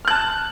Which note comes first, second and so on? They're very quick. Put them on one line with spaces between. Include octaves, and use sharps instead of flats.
F6 F#6 A5